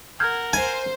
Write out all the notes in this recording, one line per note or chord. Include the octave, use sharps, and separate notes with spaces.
A#4 F#5 F6 G6 G#6
C5 G#5